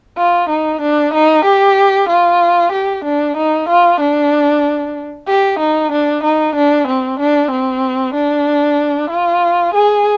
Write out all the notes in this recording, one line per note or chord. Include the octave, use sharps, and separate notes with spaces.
F4
D#4
D4
D#4
G4
F4
G4
D4
D#4
F4
D4
G4
D#4
D4
D#4
D4
C4
D4
C4
D4
F4
G#4